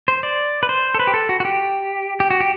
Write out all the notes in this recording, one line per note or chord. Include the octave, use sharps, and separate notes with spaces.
C5
D5
B4
C5
A4
B4
G4
A4
F#4
F#4
G4
G4
F#4
G4